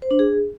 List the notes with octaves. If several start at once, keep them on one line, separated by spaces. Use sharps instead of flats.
C5
D4
G#4